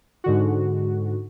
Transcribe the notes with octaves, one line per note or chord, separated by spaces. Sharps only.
G#2 D3 F#4